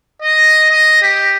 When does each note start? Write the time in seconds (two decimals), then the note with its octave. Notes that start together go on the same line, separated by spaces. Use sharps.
0.22 D#5
0.70 D#5
1.02 G4